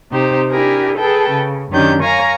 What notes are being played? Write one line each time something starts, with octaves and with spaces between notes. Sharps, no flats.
C3 D#4 G4 C5
D4 E4 G4 G#4 A#4
G#4 A4 B4 G5 A5
C#3
F#2 D#3 C#4 D4 G4 G6
A#4 C#5 F5 G#5 A#5